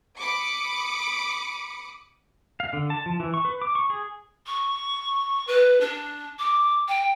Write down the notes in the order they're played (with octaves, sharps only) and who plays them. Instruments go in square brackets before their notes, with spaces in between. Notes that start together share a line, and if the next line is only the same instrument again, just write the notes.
[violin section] B5 D6 D#6 C#7
[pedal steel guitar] F5
D3
A5
F3
E3
C#6
B4
D6
C#6
G#4
[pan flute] C#6
B4
D4
D6
G5